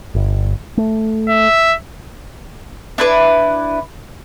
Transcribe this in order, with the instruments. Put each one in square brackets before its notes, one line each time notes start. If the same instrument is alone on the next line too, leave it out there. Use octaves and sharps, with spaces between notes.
[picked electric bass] G1
A3
[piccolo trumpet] E5
[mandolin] D4 E4 B4